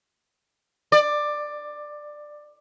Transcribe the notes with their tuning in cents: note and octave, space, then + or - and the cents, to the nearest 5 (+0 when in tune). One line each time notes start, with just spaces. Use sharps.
D5 +15